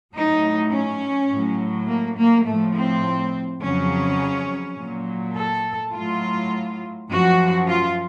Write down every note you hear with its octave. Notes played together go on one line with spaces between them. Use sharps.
A2 F#3 D#4
C#4
A2 F#3
A#3
A#3
A2 F3 A3
C4
F2 C#3 F#3 C#4
A#2 F#3
A4
A2 F#3 F4
F#2 F3 F#4
F4